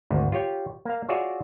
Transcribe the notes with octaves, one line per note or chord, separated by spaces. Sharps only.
G#1 D2
F4 G4 C#5 G5
A#3 F5
F4 F#4 G#4 C#5 D5 E5